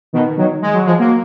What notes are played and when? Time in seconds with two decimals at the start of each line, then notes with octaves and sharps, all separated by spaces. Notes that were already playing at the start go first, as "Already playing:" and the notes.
0.13 B2 D#3
0.37 D#3 F#3
0.62 G#3
0.73 F#3
0.86 F3 G#3
0.99 F#3 A#3